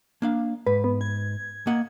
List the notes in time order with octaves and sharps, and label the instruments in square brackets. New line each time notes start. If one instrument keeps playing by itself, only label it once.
[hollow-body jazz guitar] A#3 D4 F5
[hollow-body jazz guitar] G#2 [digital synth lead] B4
[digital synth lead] B3
G#6
[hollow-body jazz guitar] A#3 D#5 F#5